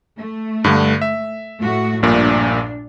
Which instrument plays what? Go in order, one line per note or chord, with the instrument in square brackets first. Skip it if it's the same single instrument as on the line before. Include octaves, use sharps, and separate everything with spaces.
[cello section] A3
[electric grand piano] G2 D3
E5
[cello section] A2 A3 F#4
[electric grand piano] A#1 G2 A#2 [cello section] D4